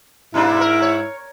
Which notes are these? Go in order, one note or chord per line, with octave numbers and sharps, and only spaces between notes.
G#2 B2 A#3 D4 E4
A#4
C#5